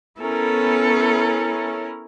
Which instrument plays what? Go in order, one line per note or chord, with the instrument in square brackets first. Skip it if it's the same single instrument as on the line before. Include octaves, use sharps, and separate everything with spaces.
[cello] B3 A4 [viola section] C#4 E4 A#4